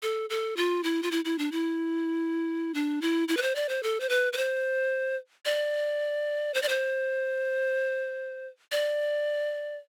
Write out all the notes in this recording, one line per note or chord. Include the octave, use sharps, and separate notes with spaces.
A4
A4
F4
E4
F4
E4
E4
D4
E4
D4
E4
E4
B4
C5
D5
C5
A4
C5
B4
B4
C5
D5
C5
D5
C5
D5